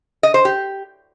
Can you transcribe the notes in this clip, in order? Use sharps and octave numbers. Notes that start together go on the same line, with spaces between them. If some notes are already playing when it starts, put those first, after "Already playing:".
D#5
C5
G4